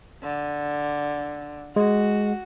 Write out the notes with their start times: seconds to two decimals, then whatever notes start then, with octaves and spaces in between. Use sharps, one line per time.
0.23 D3
1.76 G#3 F#4